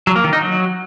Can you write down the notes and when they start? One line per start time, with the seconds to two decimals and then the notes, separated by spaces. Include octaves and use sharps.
0.07 F#3
0.16 A#3
0.24 D#3
0.33 D#4
0.41 F#3